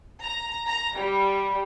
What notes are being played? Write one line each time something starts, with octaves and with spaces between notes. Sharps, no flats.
A#5
A#5
G3